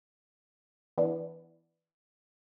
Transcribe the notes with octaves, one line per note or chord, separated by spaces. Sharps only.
E3 B3 D4